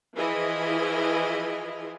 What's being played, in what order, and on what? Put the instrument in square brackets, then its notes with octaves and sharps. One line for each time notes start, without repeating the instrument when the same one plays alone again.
[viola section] E3 F3 E4 G#4 D#5